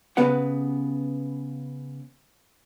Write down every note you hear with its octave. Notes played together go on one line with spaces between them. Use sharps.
C#3 B3 G4 B4 F#5